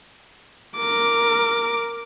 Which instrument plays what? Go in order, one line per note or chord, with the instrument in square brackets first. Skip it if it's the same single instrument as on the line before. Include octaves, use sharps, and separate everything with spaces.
[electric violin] A#4 D6